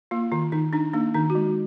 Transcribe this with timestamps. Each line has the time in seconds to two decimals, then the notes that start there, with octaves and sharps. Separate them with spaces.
0.11 A#3 F4
0.32 D#3 F4
0.52 D#3 D#4
0.73 D4 D#4
0.94 A#3 D4
1.14 D#3 D#4
1.30 F#4
1.35 G#3